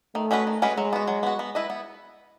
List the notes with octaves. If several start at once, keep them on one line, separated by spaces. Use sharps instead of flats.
D#3 A3
G#3 C#4 F#4 B4
D#3
G#3 C#4 F#4 B4
F#3 G#3
B3 F#4
F#3
B3 F#4
B3
E4 B4 D#5
B3